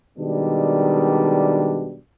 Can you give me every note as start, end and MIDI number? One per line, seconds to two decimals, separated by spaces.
0.18 1.98 47
0.18 1.98 51
0.18 1.98 55
0.18 1.98 56
0.18 1.98 62